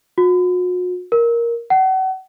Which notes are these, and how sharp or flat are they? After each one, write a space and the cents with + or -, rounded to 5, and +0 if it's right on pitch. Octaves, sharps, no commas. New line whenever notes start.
F#4 -40
A#4 +5
F#5 +35